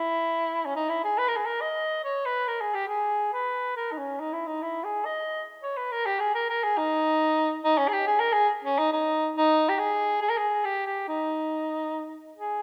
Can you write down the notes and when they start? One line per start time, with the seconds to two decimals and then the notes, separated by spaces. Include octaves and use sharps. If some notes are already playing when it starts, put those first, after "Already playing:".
Already playing: E4
0.65 C#4
0.75 D#4
0.89 E4
1.04 G#4
1.18 B4
1.28 A#4
1.36 G#4
1.46 A#4
1.61 D#5
2.04 C#5
2.26 B4
2.47 A#4
2.61 G#4
2.74 G4
2.88 G#4
3.33 B4
3.76 A#4
3.92 D#4
3.98 C#4
4.20 D#4
4.33 E4
4.47 D#4
4.62 E4
4.84 G#4
5.05 D#5
5.63 C#5
5.77 B4
5.92 A#4
6.06 G4
6.20 G#4
6.34 A#4
6.49 A#4
6.63 G#4
6.77 D#4
7.64 D#4
7.78 C#4
7.88 G#4
7.93 G4
8.07 G#4
8.20 A#4
8.33 G#4
8.64 C#4
8.78 D#4
8.93 D#4
9.36 D#4
9.69 G4
9.79 G#4
10.22 G#4
10.30 A#4
10.37 G#4
10.65 G4
10.86 G4
11.08 D#4
12.37 G#4